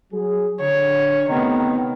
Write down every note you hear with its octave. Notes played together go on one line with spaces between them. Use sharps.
F#3 G#4
D3 C#5
C3 D#3 A3 B3